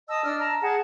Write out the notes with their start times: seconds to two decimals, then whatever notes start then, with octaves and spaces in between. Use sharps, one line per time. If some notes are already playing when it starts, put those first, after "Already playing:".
0.09 D#5 A5 D#6 E6
0.25 D4 E6 F6
0.39 A5 A#5
0.62 G#4 F#5 A5